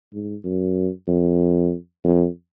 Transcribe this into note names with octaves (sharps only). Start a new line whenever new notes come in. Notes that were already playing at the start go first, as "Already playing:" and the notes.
G#2
F#2
F2
F2